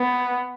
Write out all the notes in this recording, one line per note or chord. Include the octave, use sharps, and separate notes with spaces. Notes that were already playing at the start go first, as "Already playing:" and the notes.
Already playing: B3